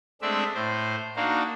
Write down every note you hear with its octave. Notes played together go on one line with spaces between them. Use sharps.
G#3 A3 C4 D4 D5 E5
A2 C5
A#3 D4 D#4 F#4 F5